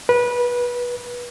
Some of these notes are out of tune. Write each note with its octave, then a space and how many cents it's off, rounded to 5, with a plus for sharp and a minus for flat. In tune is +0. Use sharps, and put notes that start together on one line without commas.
B4 -25